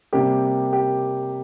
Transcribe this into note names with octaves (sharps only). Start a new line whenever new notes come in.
C3 G3 A#3 G4
G4